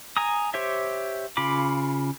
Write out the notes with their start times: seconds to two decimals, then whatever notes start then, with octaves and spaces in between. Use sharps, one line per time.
0.17 G#5 A#5 D#6
0.54 G4 C5 C#5 E5
1.37 C#3 F4 B5 D6